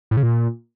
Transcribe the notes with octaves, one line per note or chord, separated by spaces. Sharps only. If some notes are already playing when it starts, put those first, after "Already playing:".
A2
C#3
A#2